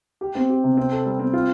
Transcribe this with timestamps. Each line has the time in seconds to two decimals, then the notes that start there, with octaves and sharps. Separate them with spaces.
0.21 G4
0.35 C4
0.50 G4
0.64 C3
0.77 C4
0.92 A4
1.05 G3
1.19 C4
1.33 F4